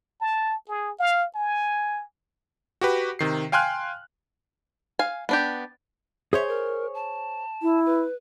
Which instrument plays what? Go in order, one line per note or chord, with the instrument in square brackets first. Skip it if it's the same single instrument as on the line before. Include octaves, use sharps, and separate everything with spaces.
[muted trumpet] A5
G#4
F5
G#5
[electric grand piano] F#4 G4 B4
C3 D#3 C7
F5 G5 G#5 C6 F6 F#6
[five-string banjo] F5 G#5
B3 D4 G4
[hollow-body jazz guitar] G#4 C5 C#5 [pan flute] E5
[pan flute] A#4
A5
[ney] E4
[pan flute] B4